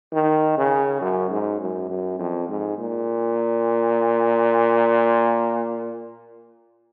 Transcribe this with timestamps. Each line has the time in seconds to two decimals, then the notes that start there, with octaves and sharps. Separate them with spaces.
0.13 D#3
0.57 C#3
1.01 F#2
1.31 G#2
1.61 F#2
1.90 F#2
2.19 F2
2.49 G#2
2.78 A#2